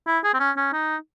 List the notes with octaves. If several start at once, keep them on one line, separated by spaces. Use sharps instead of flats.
E4
G#4
C4
C#4
C#4
D#4